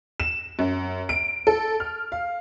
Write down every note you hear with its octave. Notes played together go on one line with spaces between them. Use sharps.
E7
F#2
D7
A4
F6
F5